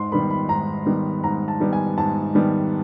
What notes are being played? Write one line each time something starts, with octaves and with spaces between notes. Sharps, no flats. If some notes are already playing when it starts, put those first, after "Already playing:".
Already playing: G#2 C6
D#3 G3 B3 B5
B5
G#2 A#5
D#3 G3 B3
G#2 A#5
A5
D#3 G3 B3
G#5
G#2 A5
D#3 G3 B3